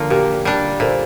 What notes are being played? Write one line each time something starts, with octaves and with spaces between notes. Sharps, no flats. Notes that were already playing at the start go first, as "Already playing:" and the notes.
Already playing: D3 F3 A#3
A#2 G4 A#4
G3 D4
A#2 A4 C5